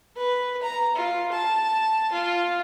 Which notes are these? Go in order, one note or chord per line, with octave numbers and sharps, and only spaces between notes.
B4
A#5
F4
A5
F4